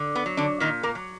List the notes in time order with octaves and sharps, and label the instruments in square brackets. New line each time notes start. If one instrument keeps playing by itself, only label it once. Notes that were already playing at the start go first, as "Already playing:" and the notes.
Already playing: [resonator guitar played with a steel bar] D3
B3
F#3
D3 D4
A#2 D#3 D#4
A#3 A#4
F#3